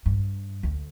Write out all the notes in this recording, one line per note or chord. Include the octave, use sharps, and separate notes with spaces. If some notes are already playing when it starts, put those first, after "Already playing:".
G2
D2